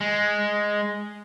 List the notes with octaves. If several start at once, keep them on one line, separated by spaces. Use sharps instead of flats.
G#3